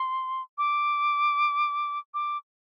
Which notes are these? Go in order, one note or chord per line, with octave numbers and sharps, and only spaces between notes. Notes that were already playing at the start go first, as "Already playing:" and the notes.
Already playing: C6
D6
D6